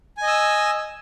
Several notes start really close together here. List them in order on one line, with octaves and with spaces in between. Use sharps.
G#5 D#5 E6